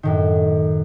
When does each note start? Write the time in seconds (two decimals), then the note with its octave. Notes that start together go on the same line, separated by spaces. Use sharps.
0.03 F#2 A2 D#3